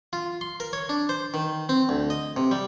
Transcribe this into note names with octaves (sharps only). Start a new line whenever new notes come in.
F4
C6
A#4
C#5
D4
C5
D#3
C4
D2
D#5
C3
G3